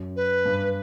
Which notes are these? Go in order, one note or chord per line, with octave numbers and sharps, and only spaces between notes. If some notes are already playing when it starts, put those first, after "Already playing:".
Already playing: F#2
B4
G2